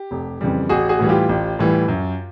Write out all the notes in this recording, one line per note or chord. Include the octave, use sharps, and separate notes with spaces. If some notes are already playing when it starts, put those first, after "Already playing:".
Already playing: G4
F1
F2 C#3 E3 G3
A1 F#4 G#4
F#4 G#4
A2 E3 G3
F4 G4
A1
A2 E3 G3
F#2